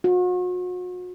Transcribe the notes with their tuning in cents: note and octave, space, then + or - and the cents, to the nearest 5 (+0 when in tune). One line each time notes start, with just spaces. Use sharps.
F#4 -40